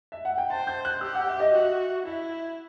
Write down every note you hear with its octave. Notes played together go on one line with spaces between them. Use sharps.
E5
F#5
G5
C5 A5
G6
F#6
G4 E6
F#5
E5
D#5
F#4 E5
E4 E5